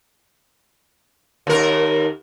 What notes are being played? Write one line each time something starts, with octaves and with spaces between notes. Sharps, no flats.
D#2 A#4